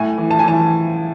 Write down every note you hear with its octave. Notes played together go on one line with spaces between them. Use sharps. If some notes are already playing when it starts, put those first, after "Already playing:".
Already playing: A2 G#5
E3
A5
G#5
E3 A5